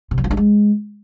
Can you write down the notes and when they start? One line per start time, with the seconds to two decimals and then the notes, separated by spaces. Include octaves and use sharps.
0.11 C3
0.18 E3
0.24 F3
0.31 G2
0.37 G#3